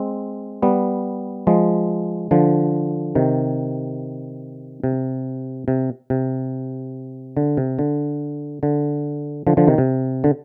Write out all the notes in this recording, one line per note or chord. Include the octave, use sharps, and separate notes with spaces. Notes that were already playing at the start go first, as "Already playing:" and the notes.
Already playing: G#3 C4
G3 B3
F3 G#3
D3 F3
C3 D#3
C3
C3
C3
D3
C3
D3
D3
D3 F3
D3 F3
C3 D#3
C3
D3